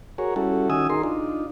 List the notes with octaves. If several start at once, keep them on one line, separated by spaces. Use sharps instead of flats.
F#4 G#4 A#4 C#5
G3 C#4 E4 F#4 A4
D#3 C#4 F#4 G#5 D#6 E6
D#4 G#4 A#4 C6
D4 D#4 F4